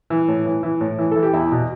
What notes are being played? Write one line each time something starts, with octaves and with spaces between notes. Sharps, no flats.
E3
A2
E3
E3
A2
E3
E3 A4
G4
E2 E4
B2